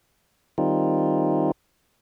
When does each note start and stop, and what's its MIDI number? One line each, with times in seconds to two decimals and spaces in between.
0.58 1.51 51
0.58 1.51 55
0.58 1.51 60
0.58 1.51 63
0.58 1.51 65